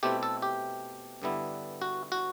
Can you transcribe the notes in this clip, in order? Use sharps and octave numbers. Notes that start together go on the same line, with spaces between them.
B2 A3 C4 E4 G4
A4
G4
G2 D3 G3 B3 E4
F#4
F#4